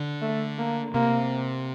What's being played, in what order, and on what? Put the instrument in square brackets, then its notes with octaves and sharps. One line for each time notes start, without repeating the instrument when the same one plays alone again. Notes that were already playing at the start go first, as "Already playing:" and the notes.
Already playing: [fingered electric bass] D3
[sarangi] A3
A#3
[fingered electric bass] C3 [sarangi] A#3